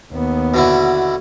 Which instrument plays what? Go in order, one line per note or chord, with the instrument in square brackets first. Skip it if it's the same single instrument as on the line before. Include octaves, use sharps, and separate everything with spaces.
[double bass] D#2 B3
[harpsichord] B2 D3 E4